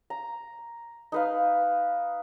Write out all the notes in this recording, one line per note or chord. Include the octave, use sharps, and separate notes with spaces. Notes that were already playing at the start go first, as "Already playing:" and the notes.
A#5
D#4 B4 F5